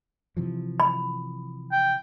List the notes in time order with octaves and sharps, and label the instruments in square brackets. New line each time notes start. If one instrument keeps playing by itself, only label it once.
[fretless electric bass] C3 E3 F3
[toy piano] B5
[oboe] G5